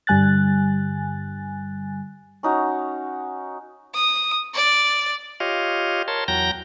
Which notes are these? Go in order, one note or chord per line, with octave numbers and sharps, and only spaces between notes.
G2 D3 G3 G#5 F#6 A6
C#4 D#4 F#4
D#6
D5
F4 G4 C#5 D#5 F5
A#4 C#5 A5 C6
E2 F#3 G5 A#5 G6 A#6